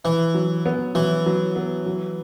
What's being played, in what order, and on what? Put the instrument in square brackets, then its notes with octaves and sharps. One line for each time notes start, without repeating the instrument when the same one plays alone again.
[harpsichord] E3 [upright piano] E4
[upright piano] F#3
B3
[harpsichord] E3 [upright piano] F#3
[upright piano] F#3
B3
F#3